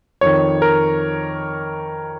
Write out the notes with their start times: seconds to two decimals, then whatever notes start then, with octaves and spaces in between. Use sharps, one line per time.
0.21 F2 D#3 C#5
0.62 A#4